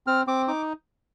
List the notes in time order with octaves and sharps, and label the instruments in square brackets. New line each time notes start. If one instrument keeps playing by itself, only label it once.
[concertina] C4 F6
C4 D6
D#4 D6